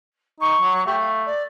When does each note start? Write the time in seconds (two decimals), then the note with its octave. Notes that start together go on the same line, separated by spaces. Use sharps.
0.40 D#4 C#6
0.60 F#3
0.86 A3 G4
0.99 F5
1.26 D5